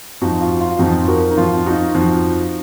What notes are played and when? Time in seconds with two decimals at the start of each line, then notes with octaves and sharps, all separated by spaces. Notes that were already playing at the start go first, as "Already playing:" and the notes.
0.21 F2 F3 D#4 F#4
0.41 F4
0.60 F4
0.79 F2 F3 D#4 F#4
1.08 F#4 A#4
1.31 D#4
1.37 F2 F3 F4
1.66 D#4 F#4
1.95 F2 F3